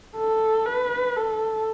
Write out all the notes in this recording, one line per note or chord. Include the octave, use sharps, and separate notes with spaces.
A4
B4
A4